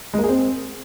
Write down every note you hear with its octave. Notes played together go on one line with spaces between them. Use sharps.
G#3
A#3
G#4
C4